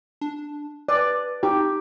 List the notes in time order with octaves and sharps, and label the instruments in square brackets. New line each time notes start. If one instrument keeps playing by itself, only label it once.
[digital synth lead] D4
[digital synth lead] B4 [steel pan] D5
[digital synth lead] D#4 [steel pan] G4